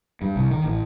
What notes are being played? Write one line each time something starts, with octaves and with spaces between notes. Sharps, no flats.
G2
C2
D#3
A1